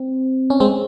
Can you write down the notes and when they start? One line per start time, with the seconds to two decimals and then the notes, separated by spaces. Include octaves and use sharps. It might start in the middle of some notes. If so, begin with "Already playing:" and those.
Already playing: C4
0.50 C#4
0.60 G#3 C4